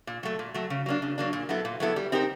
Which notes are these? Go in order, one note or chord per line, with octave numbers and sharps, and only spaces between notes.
A#2
F#3 A3
A#2
F#3 A3
C#3
F#3 A#3 D4
C#3
F#3 A#3 D4
A#2
F#3 B3 E4 A4
A#2
F#3 B3 E4 A4
G3
C4 D#4 G4 A#4